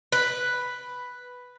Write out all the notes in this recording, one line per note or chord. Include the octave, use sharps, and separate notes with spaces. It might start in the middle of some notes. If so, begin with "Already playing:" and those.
B4